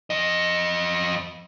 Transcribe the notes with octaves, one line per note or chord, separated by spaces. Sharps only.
F2 D#5